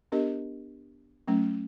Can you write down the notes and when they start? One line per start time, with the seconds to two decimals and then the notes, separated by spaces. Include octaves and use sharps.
0.12 B3 D4 G4 A#4 D#5
1.28 F#3 A3 C#4